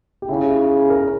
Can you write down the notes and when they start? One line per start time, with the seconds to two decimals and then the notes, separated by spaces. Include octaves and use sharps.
0.22 G4
0.29 C#3 E4
0.50 E4
0.70 G#4
0.87 G#4
0.90 A#4